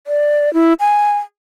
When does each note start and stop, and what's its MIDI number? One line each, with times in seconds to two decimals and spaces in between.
0.07 0.52 74
0.54 0.73 64
0.80 1.18 80